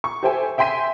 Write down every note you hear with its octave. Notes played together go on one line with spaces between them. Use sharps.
C#6
G4 A4 C5 E5 G5 G#5
E5 G5 G#5 C6 B6 D#7